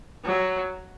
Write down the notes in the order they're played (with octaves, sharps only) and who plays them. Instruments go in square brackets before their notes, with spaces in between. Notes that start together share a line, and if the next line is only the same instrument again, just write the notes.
[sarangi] F#3